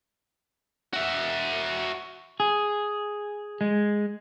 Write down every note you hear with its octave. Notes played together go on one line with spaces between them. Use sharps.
F#4 E5
G#4
G#3